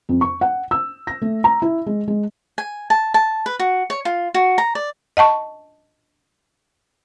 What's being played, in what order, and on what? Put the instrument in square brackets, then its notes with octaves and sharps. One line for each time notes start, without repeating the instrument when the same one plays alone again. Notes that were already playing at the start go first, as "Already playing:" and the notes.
[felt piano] F2
C#6
F#5
E6
A#6
A3
A#5
E4
G#3
G#3
[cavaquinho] G#5
A5
A5
B4
F#4
C#5
F4
F#4
A#5
D5
[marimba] D#5 F#5 A5 C#6